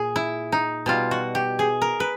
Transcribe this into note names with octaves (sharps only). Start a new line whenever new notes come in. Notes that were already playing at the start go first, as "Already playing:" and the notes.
Already playing: A#2 G#4
E4
D#4
B2 G3 F4
F#4
G4
G#4
A#4
B4